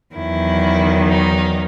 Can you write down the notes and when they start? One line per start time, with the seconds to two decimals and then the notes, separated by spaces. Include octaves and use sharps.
0.15 E2 D#3 F#3 E4
1.08 D#4